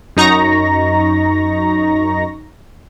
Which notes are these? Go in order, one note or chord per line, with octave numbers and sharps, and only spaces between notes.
F#2 D#4 A#5 C#6 A#6